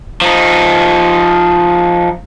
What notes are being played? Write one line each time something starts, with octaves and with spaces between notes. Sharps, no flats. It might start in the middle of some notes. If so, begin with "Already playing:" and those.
F3 D#4